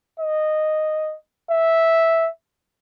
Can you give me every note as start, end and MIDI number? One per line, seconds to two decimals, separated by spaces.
0.20 1.16 75
1.51 2.29 76